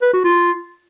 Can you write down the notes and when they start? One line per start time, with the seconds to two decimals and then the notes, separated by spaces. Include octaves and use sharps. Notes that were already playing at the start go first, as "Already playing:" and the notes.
0.02 B4
0.13 F#4
0.25 F4